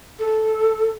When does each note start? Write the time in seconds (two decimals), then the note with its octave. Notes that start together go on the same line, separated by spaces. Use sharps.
0.19 A4